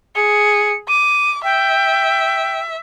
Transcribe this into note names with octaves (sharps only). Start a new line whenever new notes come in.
G#4 C#7
D6 D#7
E5 G5